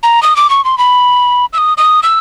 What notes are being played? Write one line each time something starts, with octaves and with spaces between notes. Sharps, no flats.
A#5
D#6
D6
C#6
C6
B5
E6
D#6
D#6
E6